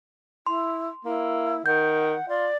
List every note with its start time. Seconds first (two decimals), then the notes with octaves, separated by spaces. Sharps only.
0.47 E4 C6
1.05 A#3 E4
1.66 D#3 F#5 G6
2.28 F4 D5